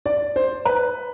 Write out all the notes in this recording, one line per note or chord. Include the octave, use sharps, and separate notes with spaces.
D5
C5
B4